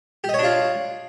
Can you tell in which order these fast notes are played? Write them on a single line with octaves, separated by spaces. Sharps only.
G4 D#5 C#5 D4 F4